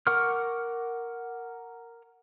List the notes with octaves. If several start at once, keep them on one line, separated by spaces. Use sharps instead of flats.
A#4 F#5 C#6 D6 F6